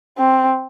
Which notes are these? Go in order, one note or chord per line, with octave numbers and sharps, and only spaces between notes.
C4